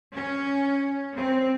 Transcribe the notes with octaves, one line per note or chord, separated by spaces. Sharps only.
C#4
C4